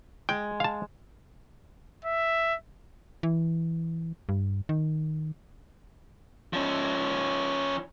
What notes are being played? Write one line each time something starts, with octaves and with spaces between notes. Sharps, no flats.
G#3 G5
F5 A5
E5
E3
G2
D#3
F3 C#4